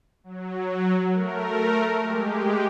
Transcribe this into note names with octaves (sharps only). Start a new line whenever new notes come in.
F#3
A3 A#4
G#3 G4